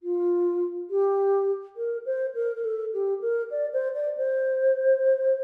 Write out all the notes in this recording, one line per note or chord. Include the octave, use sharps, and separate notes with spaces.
F4
G4
A#4
C5
A#4
A#4
A4
G4
A#4
D5
C5
D5
C5